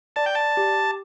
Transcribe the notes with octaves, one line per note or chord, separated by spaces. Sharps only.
D5 A5
G5
A5
G4